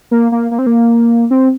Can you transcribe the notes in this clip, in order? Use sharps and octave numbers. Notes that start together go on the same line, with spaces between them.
A#3
A#3
A#3
C4
A#3
C4